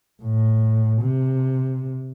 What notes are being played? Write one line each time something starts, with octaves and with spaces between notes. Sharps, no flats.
A2
C3